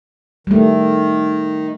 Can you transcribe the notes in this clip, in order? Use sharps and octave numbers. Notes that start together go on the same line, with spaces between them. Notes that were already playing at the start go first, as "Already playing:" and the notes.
D#3 G3 A3